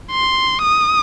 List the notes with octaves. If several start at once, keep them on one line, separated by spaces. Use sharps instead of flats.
C6
D#6